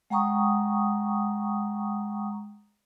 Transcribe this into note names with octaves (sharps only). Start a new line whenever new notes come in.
G#3 F#5 G5 A#5 C#6 D#6